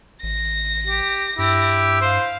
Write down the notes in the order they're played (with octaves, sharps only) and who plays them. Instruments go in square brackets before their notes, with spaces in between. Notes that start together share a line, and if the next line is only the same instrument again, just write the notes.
[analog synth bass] A1 [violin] A#6
[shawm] G4
[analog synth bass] G2 [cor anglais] E4 [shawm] G4
[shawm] C5 [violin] F5